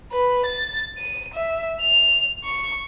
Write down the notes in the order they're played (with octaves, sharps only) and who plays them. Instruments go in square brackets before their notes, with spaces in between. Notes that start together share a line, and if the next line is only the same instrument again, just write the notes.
[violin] B4
A6
D#7
E5
F7
C#6